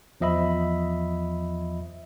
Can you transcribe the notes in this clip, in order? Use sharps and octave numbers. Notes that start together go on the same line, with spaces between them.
E2 F3 D#5 E5 B5